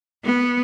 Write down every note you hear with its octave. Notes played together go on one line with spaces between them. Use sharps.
B3